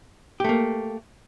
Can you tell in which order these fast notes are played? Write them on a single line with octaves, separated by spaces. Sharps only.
G4 A3 A#3